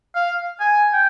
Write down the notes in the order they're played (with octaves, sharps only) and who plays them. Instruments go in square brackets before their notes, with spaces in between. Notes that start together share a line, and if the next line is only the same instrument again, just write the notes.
[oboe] F5
G#5
G5